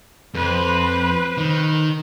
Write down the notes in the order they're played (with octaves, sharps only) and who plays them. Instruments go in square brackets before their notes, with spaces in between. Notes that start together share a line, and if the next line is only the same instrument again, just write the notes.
[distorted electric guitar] F2 [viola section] B4 C5
[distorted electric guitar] D#3